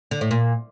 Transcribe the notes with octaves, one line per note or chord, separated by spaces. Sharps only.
D3
A2
A#2